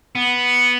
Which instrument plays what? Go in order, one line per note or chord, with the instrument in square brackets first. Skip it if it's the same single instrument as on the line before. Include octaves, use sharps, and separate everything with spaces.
[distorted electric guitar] B3